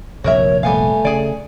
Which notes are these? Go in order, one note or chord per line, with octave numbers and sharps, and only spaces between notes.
F1 A#1 F#4 A#4 C#5 E5
G3 A3 B3 F5 G#5
C#3 G#4 D5